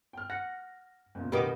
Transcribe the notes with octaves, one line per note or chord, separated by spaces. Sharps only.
G5 F6
F#5 A#6
F#1 E2 A#2
B2 D#3 B3 G4 D#5 D6